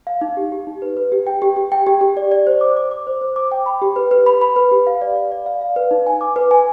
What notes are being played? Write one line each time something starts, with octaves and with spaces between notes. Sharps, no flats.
F5
D#4
G4
G4
D#4
B4
B4
G4
G5
G4
G4
G5
G4
G4
D5
D5
C5
D6
D6
D6
C5
C5
D6
G5
B5
G4
B4
B4
B5
B5
B4
G4
F5
D5
D5
D5
F5
F5
B4
D#4
G#5
D6
B4
G#5